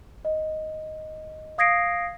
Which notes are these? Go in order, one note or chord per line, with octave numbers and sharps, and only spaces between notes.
D#5
F5 D#6 G#6 A#6 C7 D7